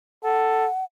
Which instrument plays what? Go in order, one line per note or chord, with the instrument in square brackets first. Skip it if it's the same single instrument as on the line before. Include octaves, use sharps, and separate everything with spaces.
[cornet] A4 [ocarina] F#5